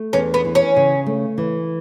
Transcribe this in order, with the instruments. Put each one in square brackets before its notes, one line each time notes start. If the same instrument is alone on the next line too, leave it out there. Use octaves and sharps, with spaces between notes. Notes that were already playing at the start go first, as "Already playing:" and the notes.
Already playing: [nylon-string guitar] A3
[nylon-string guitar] E2 [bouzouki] C#4
[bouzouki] B3
[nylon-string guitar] E3
[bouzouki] C#4
[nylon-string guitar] C#3
A3
E3